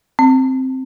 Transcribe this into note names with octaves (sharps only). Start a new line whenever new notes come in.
C4